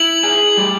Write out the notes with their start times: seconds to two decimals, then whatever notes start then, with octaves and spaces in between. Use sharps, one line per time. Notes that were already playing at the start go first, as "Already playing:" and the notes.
Already playing: E4 F#7
0.23 G#4
0.58 G3